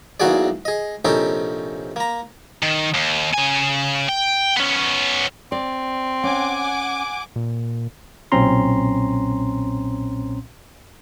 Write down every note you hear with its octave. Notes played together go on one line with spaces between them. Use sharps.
B1 E2 A#3 F#4 G#4 D5
G#4 D#5
A#1 C3 C#4 D#4 G4 A4
A#3 A#5
D#3
D#2
C#3 G#5
G5
B3 C#4
C4 D5
C#4 F#5 G#5 D6
A#2
B1 A#2 C4 C#4 A#5 C6